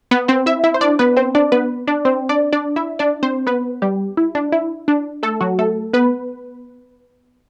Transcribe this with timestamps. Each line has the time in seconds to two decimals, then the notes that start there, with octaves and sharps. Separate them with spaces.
0.11 B3 B4
0.28 C4 C5
0.46 E4 E5
0.64 E4 E5
0.74 C5
0.81 D4 D5
0.99 B3 B4
1.17 C4 C5
1.35 D4 D5
1.52 B3 B4
1.87 D4 D5
2.05 C4 C5
2.29 D4 D5
2.53 D4 D5
2.76 E4 E5
2.99 D4 D5
3.23 C4 C5
3.47 B3 B4
3.82 G3 G4
4.17 E4
4.35 D4
4.52 E4
4.88 D4
5.23 A3 A4
5.41 F#3 F#4
5.59 A3 A4
5.93 B3 B4